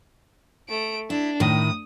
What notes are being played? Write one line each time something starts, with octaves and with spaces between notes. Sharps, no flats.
A3 D7
D4 E4
A2 D#3 D#6